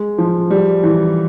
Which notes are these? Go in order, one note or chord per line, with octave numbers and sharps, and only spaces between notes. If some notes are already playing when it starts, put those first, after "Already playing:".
Already playing: G#3
F3
G3
E3